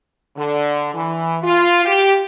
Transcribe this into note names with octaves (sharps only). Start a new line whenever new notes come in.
D3
E3
F4
G4